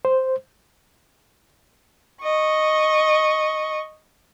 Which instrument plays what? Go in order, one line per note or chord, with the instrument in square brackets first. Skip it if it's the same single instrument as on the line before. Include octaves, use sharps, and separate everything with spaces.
[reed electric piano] C5
[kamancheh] D#5 C#6